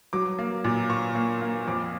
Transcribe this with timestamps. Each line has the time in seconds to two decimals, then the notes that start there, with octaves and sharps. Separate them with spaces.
0.13 F#3 D6
0.39 A#3
0.64 A#2
0.90 A#3 C#6
1.15 A#3
1.41 A#3
1.67 F2 D6